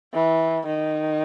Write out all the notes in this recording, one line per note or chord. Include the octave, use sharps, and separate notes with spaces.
E3
D#3